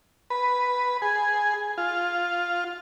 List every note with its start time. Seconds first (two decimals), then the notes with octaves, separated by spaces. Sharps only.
0.30 B4
1.02 G#4
1.78 F4